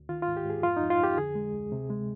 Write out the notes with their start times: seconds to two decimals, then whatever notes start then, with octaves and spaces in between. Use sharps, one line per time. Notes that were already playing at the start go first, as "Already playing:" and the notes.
Already playing: D2
0.09 D#3 F4
0.22 F4
0.27 G#2
0.37 G4
0.45 G#2 G#4
0.63 F2 F4
0.77 D#4
0.81 F2
0.90 F4
1.00 F2 G4
1.18 D3 G#4
1.35 G#3
1.54 D2
1.72 C3
1.90 G#3